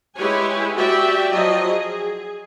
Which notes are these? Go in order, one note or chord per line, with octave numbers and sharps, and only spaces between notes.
G#3 E4 G4 B4 C#5 G#5
F#4 G4 D5 E5 G5
F3 F#3 F4 D#5
G#4